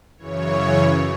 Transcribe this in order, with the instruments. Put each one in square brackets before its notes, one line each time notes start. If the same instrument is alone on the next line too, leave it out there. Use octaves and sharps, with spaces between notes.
[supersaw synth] F#2 C#3 E3 C#5